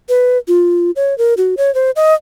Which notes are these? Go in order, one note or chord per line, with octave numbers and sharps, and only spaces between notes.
B4
F4
C#5
A#4
F#4
C#5
C5
D#5